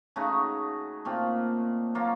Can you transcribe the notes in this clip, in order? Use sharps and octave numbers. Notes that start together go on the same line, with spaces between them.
C#3 A3 D#4 F#4
A#2 A3 C4 F4
F#3 A#3 F4